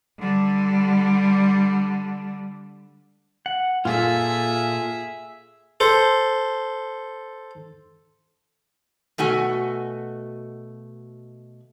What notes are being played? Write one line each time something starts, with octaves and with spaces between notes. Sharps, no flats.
D3 G3
F#5
A#2 F4 G#4 A4 E5
A4 C5
B2 A3 F#4 G#5